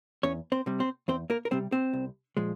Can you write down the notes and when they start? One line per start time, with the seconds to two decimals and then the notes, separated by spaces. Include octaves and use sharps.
0.23 E2 C#4 C#5
0.52 C4 C5
0.66 C3 G3
0.80 C4 C5
1.08 E2 C4 C5
1.30 A#3 A#4
1.45 A#4
1.51 C3 G3 C4 C5
1.72 C4 C5
1.93 C2
2.37 A#2 F3 G#3